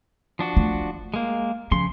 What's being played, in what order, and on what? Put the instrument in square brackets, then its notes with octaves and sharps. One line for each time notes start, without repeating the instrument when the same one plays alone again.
[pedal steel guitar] F3 D4 F#4
[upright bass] A3
[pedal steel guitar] G#3 A#3
[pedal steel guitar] C#3 C6 [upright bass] F3